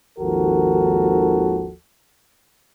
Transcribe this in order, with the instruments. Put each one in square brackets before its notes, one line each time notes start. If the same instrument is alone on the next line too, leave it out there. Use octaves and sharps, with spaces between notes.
[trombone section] G#1 D#2 F3 F#4 A4 A#4